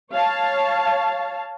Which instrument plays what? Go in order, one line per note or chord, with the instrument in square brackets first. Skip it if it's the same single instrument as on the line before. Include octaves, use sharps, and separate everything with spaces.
[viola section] C#5 F5 A5